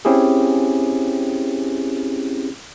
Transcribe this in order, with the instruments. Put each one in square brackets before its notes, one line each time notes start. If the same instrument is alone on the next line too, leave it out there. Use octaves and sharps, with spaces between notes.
[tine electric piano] C4 C#4 E4 G4 G#4